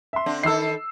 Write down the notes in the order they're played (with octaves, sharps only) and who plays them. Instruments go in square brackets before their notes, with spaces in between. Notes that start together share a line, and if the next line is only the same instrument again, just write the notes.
[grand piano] E5 C6
[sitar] D3 C4 D4
[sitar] D#3 A4 [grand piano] E6 C7